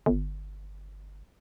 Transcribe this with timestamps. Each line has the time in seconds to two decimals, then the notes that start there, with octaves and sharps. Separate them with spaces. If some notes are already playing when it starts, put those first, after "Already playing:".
0.06 G1